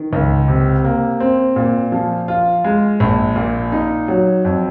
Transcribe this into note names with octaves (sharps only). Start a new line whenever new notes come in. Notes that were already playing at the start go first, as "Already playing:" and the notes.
Already playing: D#3
C#2
C3
A#3
C4
A#2
F3
F4
G#3
A#1
A#2
D#4
F#3
F2